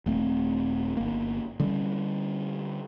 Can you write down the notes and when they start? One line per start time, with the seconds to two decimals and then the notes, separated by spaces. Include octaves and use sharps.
0.06 D#1 A3 C4
0.97 G1 A#3
1.60 D3 G3 C#4